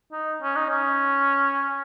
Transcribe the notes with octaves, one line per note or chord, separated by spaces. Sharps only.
D#4
C#4
D#4
C#4